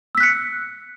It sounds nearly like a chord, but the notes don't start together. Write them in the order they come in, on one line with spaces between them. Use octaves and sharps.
E6 B6 F#6 C#7